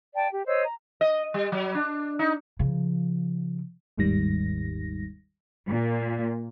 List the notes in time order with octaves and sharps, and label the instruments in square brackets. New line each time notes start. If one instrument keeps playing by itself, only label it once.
[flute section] D5 G5 A5
G4
C5 C#5 D#5 E6
A#5
[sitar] D#5
G3
F#3
D4
D#4
[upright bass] C#3 F3
[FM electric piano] G1 D#2 G#2 D#3 G3 A#6
[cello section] A#2